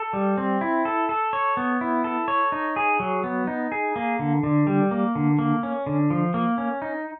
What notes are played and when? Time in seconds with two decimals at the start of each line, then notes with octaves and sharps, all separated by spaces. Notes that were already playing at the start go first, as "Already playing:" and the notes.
Already playing: A4
0.13 G3
0.38 C4
0.61 E4
0.85 A4
1.09 A4
1.33 C#5
1.57 B3
1.81 E4
2.04 A4
2.28 C#5
2.52 D#4
2.76 G#4
3.00 F#3
3.24 B3
3.47 D#4
3.72 G#4
3.96 A#3
4.19 D3
4.43 D3
4.67 G3
4.91 A#3
5.15 D3
5.39 A#3
5.63 C#4
5.86 D3
6.10 F3
6.34 A#3
6.58 C#4
6.82 D#4